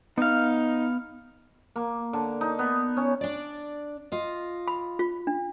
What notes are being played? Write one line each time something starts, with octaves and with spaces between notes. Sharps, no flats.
B3 D#4 F5
A#3
D3
D#4
B3
C#4
D4 D5
F4 D#5
B5
F4
D4